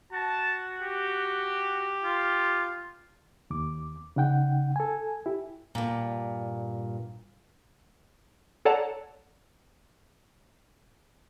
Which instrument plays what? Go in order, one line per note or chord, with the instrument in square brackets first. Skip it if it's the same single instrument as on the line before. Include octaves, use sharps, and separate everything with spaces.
[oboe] F#4 [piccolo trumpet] A5
[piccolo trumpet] G4
[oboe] F4
[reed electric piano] D#2 D6
C#3 D#4 F#5 G5
A4 G#5
E4 G4
[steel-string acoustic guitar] G2 A#2
[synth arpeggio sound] A4 C#5 D5 F#5 A5 A#5